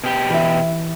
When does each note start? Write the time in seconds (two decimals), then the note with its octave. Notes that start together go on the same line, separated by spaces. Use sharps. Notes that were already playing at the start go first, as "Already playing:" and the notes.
0.04 B2 G4
0.30 E3 E5